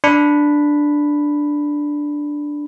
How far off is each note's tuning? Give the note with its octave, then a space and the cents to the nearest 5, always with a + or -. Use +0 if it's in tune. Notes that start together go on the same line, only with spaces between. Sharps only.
D4 +0 B5 +0